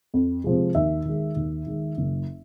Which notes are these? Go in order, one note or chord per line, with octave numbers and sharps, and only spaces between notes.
F2
C3 F3 G#3
D#2 E5
D#3 G#3
D#2
D#3 G#3
F#1